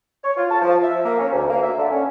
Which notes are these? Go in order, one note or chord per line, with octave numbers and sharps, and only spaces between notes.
C#5
F4
A5
F3
E5
A#3
C#4
D2
A#3
E5
D3
C#4